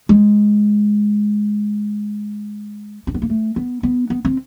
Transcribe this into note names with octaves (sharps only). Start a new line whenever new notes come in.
G#3
C4
B3
A#3
A3
B3
B3
B3
C4